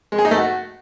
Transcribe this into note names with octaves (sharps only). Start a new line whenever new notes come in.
G#3
G#4
D#4
A3
F#4